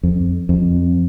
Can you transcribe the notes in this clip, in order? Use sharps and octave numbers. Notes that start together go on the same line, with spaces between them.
F2
F2